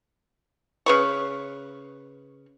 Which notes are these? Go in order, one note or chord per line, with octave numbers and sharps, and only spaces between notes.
C#3 B4 C#6